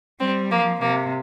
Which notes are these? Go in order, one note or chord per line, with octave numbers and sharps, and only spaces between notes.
G3 C4
F3 A#3
C3 A#3